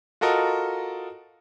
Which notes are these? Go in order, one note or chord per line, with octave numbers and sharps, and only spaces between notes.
F4 F#4 A4 A#4 D#5